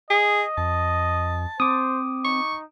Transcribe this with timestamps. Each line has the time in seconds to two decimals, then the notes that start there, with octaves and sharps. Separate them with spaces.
0.10 G#4 D#5
0.58 F2 A5
1.60 C4 C5 D6 D#6
2.24 D#4 C#6